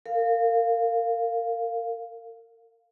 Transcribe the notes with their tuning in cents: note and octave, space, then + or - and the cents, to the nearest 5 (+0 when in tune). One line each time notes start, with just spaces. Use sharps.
A#4 -35 F5 +0